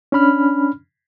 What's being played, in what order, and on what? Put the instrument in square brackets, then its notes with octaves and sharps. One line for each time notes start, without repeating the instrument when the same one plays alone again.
[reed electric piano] C#4 D4 B5 F6